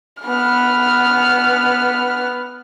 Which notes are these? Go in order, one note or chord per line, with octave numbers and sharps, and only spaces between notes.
B3 F6